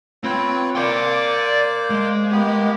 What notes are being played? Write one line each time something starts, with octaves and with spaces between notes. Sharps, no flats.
C4 F4 B4 C#5
A#3 C5 D5 C6 D6
G#3
A#3 B3 G4